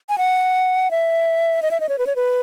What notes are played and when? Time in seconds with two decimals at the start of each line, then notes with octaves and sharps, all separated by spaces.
0.09 G#5
0.18 F#5
0.91 E5
1.62 D#5
1.71 E5
1.80 D#5
1.89 C#5
1.98 B4
2.07 C#5
2.16 B4